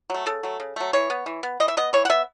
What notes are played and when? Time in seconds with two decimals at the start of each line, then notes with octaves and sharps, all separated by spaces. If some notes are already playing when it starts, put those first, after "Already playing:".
0.10 F#3 A3
0.26 C#3 A4
0.43 F#3 A3
0.60 C#3
0.76 F#3 A3
0.93 E3 C#5
1.10 B3
1.26 E3
1.43 B3
1.60 E3 D#5
1.68 E5
1.77 B3 D#5
1.93 E3 C#5
2.05 F#5
2.09 B3 E5